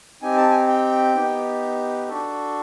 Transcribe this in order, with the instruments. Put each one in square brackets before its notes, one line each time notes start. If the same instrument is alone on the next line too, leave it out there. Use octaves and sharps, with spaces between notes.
[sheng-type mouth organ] C4 D#4 G4 G#5
A5
G#5
G5
B3 D#4 G4
D4 F#4 A4